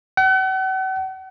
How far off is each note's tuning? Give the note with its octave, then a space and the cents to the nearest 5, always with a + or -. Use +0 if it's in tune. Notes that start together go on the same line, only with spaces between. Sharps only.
F#5 +40